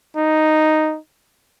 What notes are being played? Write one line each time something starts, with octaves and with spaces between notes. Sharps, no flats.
D#4